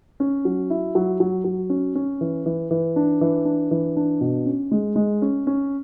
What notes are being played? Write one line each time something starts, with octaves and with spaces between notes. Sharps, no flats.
C#4
F#3
E4
F#3
F#3
F#3
C#4
C#4
E3
E3
E3
D4
E3
D4
E3
D4
B2
C#4
G#3
G#3
C#4
C#4